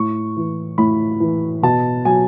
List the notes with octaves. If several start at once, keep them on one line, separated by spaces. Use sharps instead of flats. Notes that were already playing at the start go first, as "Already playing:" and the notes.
Already playing: A2 C#6
E3
A2 B5
E3
B2 A5
F#3 G#5